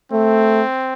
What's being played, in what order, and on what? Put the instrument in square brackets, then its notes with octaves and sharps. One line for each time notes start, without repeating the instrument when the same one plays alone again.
[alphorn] A3 [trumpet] C4